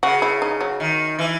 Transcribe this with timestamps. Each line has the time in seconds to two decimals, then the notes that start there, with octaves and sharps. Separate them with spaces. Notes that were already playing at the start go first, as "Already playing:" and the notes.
0.03 C#3 F#4
0.22 E4
0.42 D#4
0.61 F#3
0.80 D#3
1.19 E3